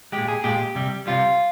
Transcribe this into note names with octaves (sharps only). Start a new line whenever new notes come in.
A#2 G#3 G4
G#4
A#2 G#3 G4
C3 G3
C3 G3 F4